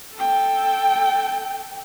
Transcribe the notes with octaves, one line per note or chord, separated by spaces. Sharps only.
A4 G5